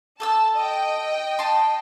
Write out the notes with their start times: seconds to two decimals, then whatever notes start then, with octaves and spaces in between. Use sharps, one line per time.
0.20 A4 A5 D#6 E6
0.56 D#5 G5
1.39 A5 C6